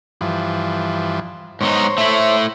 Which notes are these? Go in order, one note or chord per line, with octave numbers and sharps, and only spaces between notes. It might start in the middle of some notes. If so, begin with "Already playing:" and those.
G2 E3 F3
G#2 B3 D#4 C5 C#5
A3 E4